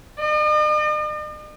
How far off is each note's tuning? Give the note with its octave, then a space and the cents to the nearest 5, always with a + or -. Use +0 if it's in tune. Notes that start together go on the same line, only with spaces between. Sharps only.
D#5 -45